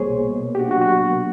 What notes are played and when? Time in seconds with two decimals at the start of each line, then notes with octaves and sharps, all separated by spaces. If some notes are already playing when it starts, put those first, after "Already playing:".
Already playing: C2 G3 A#3 G#4 C5 C#5
0.10 B2
0.26 B2
0.43 A#3
0.55 G4
0.59 D4 F#4
0.71 F#4
0.76 F#3
0.81 F#4
0.93 B2
1.10 A#3